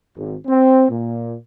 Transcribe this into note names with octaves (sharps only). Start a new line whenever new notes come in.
G#1
C4
A#2